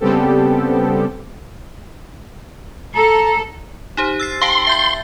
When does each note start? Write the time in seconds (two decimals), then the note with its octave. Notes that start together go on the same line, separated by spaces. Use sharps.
0.01 C#3 G3 B3 C4 G4 A4
2.96 A4 A#5
3.97 D#4 G4 C5
4.20 E6 A6 C7
4.42 F5 G5 A5 C6
4.67 E5 G6 A6